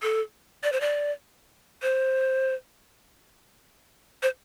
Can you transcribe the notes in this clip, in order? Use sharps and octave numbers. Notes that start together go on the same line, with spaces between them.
A4
D5
C5
D5
C5
C5